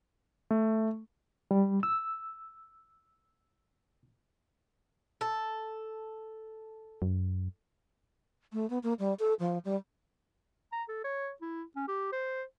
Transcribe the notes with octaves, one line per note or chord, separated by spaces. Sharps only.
A3
G3
E6
A4
F#2
A3
B3
A#3
G3
A4
F3
G3
A#5
A4
C#5
E4
C#4
G4
C5